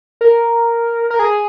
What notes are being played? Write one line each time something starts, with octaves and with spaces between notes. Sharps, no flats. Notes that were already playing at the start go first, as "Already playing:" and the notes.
A#4
A#4
G#4